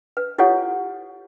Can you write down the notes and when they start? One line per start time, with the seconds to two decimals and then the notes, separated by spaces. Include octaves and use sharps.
0.17 B4
0.38 E4 F4 G4 A4 C#5 F#5